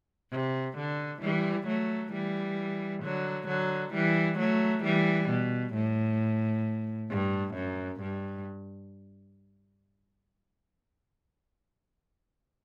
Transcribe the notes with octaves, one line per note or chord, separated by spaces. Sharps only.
C3
D3
E3 G3
F#3 A3
E3 G3
D3 F#3
D3 F#3
E3 G3
F#3 A3
E3 G3
B2
A2
G2
F#2
G2